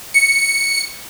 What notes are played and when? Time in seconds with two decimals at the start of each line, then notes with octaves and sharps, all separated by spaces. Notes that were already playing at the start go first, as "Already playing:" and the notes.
0.14 C#7